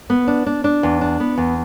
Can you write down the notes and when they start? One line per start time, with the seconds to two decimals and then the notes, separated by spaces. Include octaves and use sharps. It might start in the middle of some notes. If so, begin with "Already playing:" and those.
0.10 B3
0.27 D4
0.46 D4
0.64 D4
0.83 E2
1.01 D4
1.20 B3
1.37 E2